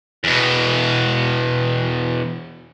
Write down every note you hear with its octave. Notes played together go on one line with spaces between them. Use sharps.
E2 B2